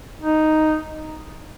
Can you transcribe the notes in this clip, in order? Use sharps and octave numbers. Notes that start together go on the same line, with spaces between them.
D#4